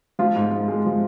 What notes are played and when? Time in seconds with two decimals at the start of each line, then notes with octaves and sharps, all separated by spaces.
0.19 F3 F4
0.36 G#2
0.51 G#2
0.68 G#3
0.86 F3